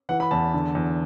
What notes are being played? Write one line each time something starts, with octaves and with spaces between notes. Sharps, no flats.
E3 F#5
B5
E2 A5
D3
E2